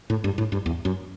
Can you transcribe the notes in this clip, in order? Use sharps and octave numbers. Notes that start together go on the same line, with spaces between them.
A2
G2
A2
G2
E2
F#2